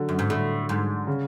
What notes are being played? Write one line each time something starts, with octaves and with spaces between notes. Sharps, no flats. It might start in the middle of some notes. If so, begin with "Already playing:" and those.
Already playing: D3 F#3
F#2
G#2
A2 D3
G#2
C#3